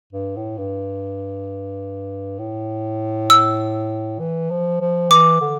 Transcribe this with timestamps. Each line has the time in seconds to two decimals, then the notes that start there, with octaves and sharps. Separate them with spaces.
0.13 G2
0.36 A2
0.58 G2
2.39 A2
3.30 E6
4.20 E3
4.50 F3
4.81 F3
5.10 E3 D6
5.41 D3